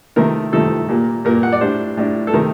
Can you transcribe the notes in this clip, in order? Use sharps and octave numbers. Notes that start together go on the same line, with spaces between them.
C3 D#3 A3 A#4
C3 D#3 A3 A4
A#2 G3 A#3
A#2 G3 A#3 A#4
F#5
D5
A2 G3 D4 C5
A2 G3 D4
A4
C3 D#3 A3 A#4